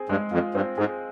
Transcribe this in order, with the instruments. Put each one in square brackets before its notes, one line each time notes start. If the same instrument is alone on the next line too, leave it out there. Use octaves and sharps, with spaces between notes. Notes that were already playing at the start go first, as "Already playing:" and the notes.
Already playing: [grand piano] C4 G#4
[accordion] G2 [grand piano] G#3
[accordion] F2 [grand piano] F4
[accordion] G2 [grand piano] C4
[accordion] G#2 [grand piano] G#4